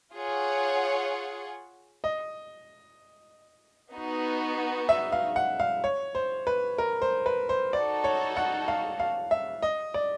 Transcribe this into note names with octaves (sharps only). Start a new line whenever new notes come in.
F4 G#4 C#5 F#5
D#5
B3 D#4 F#4
E5
F5
F#5
F5
C#5
C5
B4
A#4
C5
B4
C5
D#4 F#4 A4 D5
C#5
F#5
F5
F5
E5
D#5
D5